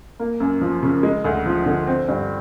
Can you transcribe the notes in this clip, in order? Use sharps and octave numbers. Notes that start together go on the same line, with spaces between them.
A#3
F#2
F3
C#3
G#3
D2
F3
D3
C4
G2